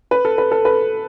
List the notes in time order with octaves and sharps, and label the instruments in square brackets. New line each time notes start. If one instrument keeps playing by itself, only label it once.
[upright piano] B4
A4
B4
A4
B4